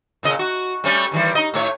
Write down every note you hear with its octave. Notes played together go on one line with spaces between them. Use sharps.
A#2 C#3 D#5
F#4
G3 A3 C#4
D#3 E3 G3
D#4 D#5
A2 A3 C#5